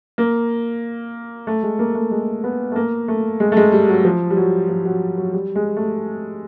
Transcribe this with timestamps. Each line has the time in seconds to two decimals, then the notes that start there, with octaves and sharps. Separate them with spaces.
0.18 A#3
1.47 A3
1.63 G#3
1.79 A#3
1.95 A3
2.11 G#3
2.44 B3
2.72 A3
2.76 A#3
3.08 A3
3.40 G#3
3.52 A3
3.57 G#3
3.72 G3
3.88 F#3
4.05 F3
4.30 G3
4.37 F#3
4.69 F3
4.85 F#3
5.18 F#3
5.33 G3
5.55 G#3
5.77 A3